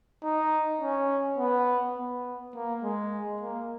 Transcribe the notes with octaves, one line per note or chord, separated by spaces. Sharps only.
D#4
C#4
B3
B3
A#3
G#3
A#3